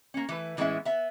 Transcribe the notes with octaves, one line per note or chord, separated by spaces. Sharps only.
A#3 C#4
E3 A3 B4
A2 E3 G#3 B3 C#4 E5
B3 E5